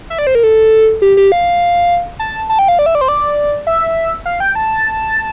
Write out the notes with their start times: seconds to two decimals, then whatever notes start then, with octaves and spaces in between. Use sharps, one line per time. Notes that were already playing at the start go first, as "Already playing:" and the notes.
0.10 E5
0.19 D5
0.27 C5
0.35 A#4
0.43 A4
1.02 G4
1.17 G4
1.32 F5
2.19 A5
2.49 A5
2.59 G5
2.68 F5
2.79 D5
2.86 E5
2.95 D5
3.01 C5
3.08 D5
3.67 E5
4.26 F5
4.40 G5
4.55 A5